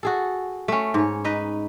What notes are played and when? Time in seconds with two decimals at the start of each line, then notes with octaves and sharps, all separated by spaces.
0.03 F#4 G#4 A4
0.68 A3 C#4
0.94 G#2 C#5
1.24 D#4 B4 D#5